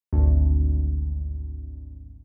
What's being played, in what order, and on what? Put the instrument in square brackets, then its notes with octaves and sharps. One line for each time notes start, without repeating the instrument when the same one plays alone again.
[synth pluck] G#1 D2